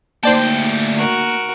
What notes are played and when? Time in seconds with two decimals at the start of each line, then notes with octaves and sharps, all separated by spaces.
0.23 D2 A#3 D#4 C5 D5 G5 A5
0.96 F#4 A#4